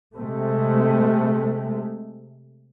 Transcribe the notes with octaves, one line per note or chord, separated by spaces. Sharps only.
C3 G#3 A3